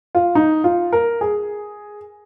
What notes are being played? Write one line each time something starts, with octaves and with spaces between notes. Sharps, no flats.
F4
D#4
F4
A#4
G#4